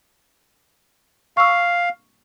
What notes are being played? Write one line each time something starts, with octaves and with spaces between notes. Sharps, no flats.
F5 C#6 E6